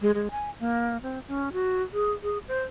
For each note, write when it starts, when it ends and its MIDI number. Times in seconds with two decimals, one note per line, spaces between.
0.01 0.11 56
0.15 0.28 56
0.31 0.50 80
0.60 0.97 58
1.02 1.19 60
1.28 1.52 61
1.53 1.82 66
1.93 2.12 68
2.23 2.38 68
2.48 2.62 72